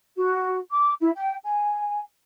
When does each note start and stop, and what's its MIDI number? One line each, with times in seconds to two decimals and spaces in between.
0.16 0.58 66
0.70 0.92 86
0.99 1.10 64
1.16 1.35 79
1.43 2.00 80